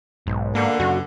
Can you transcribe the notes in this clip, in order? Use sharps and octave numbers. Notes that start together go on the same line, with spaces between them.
B1 G#2
B2 D3 A#3
F#2 C#3 F#4